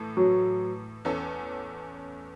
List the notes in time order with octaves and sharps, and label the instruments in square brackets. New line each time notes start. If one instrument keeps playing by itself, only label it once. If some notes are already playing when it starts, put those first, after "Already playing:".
Already playing: [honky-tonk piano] A2 E3 A4
[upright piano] F#3
[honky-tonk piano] E2 E3 C#4 A4